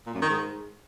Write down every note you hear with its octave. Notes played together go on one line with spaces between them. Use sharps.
A#2
F#2
D#3
G#2